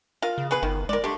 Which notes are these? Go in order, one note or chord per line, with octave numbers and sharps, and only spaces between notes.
F4 A#4 F5
C#3
B3 G#4 B4
G1 D#3
G#3 A#4 D5
D3 A3 G4